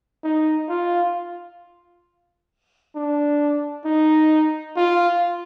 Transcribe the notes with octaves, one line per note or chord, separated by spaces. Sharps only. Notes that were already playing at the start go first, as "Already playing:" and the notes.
D#4
F4
D4
D#4
F4